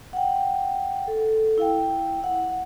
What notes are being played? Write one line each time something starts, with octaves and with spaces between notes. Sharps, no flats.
F#5 G5
A4
E4 F5 G5
F#5